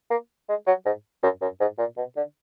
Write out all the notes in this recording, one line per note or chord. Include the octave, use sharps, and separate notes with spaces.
A#3
G#3
F#3
G#2
F#2
F#2
G#2
A#2
B2
D3